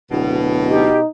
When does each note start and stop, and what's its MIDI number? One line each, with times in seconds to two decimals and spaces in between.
0.11 0.87 26
0.11 1.00 47
0.69 1.08 63
0.69 0.99 67